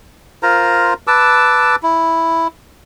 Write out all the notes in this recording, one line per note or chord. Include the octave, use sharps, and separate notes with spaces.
F4 A#4 C5 A#5
B4 A5 D6 E6
E4